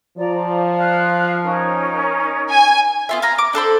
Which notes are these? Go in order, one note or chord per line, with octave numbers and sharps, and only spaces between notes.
F3 D5 A#5
F5 F6 F#6
C#4 D#4 A#4
G#5
B3 F4 E5
F5 G#5 A#5 B5
D6
D4 A4 C5 B5